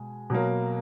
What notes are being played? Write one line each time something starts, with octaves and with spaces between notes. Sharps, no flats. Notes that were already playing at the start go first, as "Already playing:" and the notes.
Already playing: B2 G#3 G#5
B2 F#3 A#3